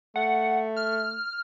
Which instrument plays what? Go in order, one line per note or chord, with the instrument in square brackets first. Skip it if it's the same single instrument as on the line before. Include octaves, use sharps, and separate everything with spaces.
[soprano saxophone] A3 [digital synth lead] F#5
[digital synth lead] F6